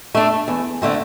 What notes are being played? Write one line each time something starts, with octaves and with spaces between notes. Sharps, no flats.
A3 D4
E2
D3 A3 C4